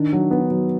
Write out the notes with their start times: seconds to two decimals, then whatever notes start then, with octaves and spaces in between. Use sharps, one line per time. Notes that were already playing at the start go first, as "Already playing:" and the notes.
Already playing: D#3 D4
0.13 F#3
0.31 B3
0.51 F#3